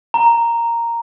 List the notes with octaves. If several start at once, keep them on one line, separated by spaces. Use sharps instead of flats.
A#5